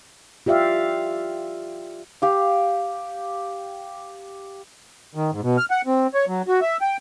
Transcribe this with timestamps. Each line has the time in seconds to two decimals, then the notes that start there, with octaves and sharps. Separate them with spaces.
0.46 F4 G4 D5 E5 F5
2.22 G4 F5
5.15 D#3
5.31 G#2
5.43 B2
5.57 F6
5.71 F#5
5.87 C4
6.14 C#5
6.28 F#3
6.48 F#4
6.61 E5
6.81 G5